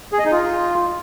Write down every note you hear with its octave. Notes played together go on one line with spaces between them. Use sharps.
G#4
D#5
D#4
F4